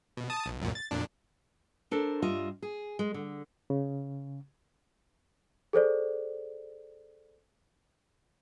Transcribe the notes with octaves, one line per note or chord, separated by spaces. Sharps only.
B2
A5 D#6
B1
C2 F#2 A#2
A6
F2 A#2 D4
D4 A4 A#4 C5
G2 G3 F4 D#5 E5
G#4
G#3
D3
C#3
G#4 A4 C5 D5